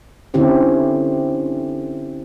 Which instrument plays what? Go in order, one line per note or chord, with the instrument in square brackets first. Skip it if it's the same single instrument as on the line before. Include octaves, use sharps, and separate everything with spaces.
[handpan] D3 C4 C#4 E4 G4 C5